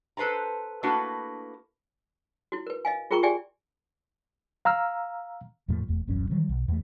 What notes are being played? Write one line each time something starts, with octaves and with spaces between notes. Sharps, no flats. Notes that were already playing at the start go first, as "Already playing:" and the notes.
A4 B4 C5 A5 A#5
A3 A#3 D4 E4 F#4 B4
E4 F#4
A#4 B4
D#5 F5 G#5
F4 G#4 A#4 G5 A#5 C#6
G4 G#4 D5 E5 G5 G#5
F5 A#5 E6 F6
E2 A2 F3 A3
F1 E2 A3
D#1 A1 F#2 C#4
D#3 E3 F#3 G3
B1
E2 A3